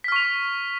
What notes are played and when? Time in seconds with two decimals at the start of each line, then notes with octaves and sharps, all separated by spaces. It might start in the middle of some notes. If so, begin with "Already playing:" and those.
0.04 B6
0.08 F6
0.12 C#6
0.16 F7